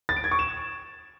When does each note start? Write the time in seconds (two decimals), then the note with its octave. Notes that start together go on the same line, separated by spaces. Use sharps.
0.09 A6
0.16 D7
0.24 G#6
0.31 C#6
0.39 E7